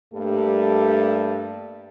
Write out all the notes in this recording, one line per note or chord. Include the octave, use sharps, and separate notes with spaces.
G2 G3 A3 A#3 G4 A4